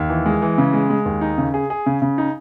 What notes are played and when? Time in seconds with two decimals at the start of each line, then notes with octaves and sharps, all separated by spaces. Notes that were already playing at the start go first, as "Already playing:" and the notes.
Already playing: D#2
0.09 E3
0.26 G#3
0.42 E3
0.58 C#3
0.73 G#3
0.90 G#3
1.06 D#2
1.21 D#4
1.38 C#3
1.54 G#4
1.70 G#4
1.86 C#3
2.02 C#3
2.18 D#4